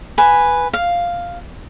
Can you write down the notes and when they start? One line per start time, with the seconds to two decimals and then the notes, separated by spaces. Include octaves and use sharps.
0.18 B4 G#5
0.73 F5